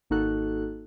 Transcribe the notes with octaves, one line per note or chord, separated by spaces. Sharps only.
G#1 A#3 D#4 F#4 A4 F#6